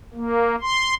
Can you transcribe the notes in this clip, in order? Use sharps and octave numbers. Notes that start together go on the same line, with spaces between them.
A#3
C6